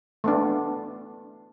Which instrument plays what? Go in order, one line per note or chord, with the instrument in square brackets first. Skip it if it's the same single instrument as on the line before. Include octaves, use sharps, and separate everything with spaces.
[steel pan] A3 B3 D4